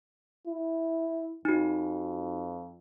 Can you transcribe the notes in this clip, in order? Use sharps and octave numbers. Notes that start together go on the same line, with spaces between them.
E4
F2 D#4 F#4